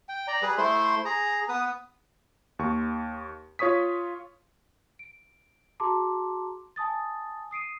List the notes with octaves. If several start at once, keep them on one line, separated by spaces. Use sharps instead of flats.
G5
D5 A#5
G3 G#4 B4
A3 E4 C5 C6
G#4 A#5
B3 B4 D#6
D#2 C#6
F4 C#5 C#6 D#6 B6
D7
F#4 G#4 A5 A#5 C6 D6
G#5 A5 D#6 A6
D#6 C7 D7 D#7